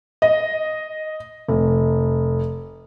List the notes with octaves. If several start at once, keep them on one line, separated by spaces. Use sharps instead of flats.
D#5
F1